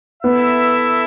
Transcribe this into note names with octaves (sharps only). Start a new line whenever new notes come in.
B3 E4 A4 E5